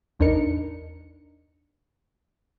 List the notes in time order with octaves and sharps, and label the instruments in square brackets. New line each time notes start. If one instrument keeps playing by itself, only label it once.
[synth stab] A1 E2 D4 D#4 A#4 C#7